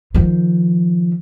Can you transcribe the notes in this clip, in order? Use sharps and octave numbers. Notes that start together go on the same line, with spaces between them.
D#3 F3